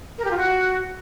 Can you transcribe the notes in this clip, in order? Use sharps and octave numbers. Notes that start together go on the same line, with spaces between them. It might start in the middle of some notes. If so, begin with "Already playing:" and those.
A#4
G4
F4
F#4